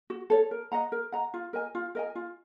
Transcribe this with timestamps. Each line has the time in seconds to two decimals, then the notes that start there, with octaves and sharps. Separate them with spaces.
0.10 F#4
0.30 A4 C#5
0.51 A#4
0.72 D#5 F#5 A#5
0.92 A#4
1.12 D#5 F#5 A#5
1.34 F4
1.53 A#4 D#5 G#5
1.75 F4
1.95 A#4 D#5 G#5
2.15 F4